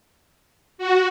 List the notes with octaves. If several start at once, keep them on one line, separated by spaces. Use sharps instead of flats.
F#4